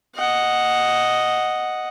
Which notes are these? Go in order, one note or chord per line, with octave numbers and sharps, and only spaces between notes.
D#5 F#5